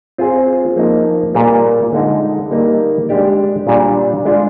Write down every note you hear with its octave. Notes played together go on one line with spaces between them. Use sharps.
C4 F4 G#4 C5
F3 A#3 D#4
A#2 G3 A#3 F4 G#4
D3 G#3 D#4
G3 A#3 D#4
G#3 D4 G4 D5
A#2 G3 D4
G#3 D4 F4